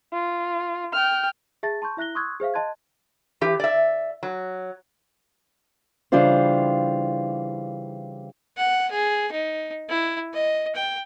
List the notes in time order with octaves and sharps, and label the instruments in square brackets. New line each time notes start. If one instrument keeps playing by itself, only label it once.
[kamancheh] F4
G5 F6
[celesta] G#4 E5 A5 A6
A5 C6 C#6 G6
E4 E5 F#6 A#6 G7
C6 C#6 D#6 E6 F#6 G#6
G#4 C5 E5 F5
D#5 A5 C6 F#6 G#6
[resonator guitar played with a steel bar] E3 G4
D5 E5
F#3
[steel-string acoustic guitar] C#3 E3 G3 D4 F4 C5
[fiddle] F#5
G#4
D#4
E4
D#5
G5